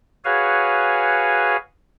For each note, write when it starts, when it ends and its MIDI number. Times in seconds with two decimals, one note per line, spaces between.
0.25 1.57 66
0.25 1.57 68
0.25 1.57 71
0.25 1.57 73
0.25 1.57 77
0.25 1.57 80